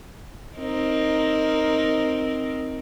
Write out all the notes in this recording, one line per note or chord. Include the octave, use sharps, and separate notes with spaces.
C4 D#4 A#4